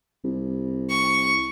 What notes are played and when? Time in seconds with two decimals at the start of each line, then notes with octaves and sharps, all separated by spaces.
0.24 C2
0.89 C#6